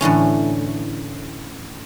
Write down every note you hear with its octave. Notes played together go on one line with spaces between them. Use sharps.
A2 D3 E3 C#4